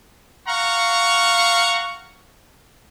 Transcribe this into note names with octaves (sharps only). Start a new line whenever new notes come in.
F5 F#5 A#5 C#6